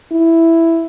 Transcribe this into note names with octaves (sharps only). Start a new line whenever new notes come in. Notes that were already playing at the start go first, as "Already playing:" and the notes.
E4